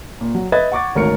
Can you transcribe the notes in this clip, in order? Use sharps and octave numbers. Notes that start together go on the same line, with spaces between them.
A#2
F#3
B4 D#5 E5 G#6 A6
F#5 C#6 D6 A6
G#1 D2 G#2 A#4 C#5 C#7